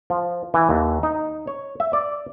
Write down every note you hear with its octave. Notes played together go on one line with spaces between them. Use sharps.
F3
E3
D#2
D#4
C#5
E5
D5